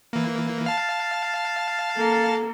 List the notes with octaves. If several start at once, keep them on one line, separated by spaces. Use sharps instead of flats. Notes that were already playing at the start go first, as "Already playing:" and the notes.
E3 A#3
F5 A5
A#3 A4